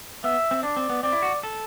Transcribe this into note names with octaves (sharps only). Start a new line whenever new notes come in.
B3 E5
C4
D4 D5
C4
B3
C4 D5
E4
F#4
A4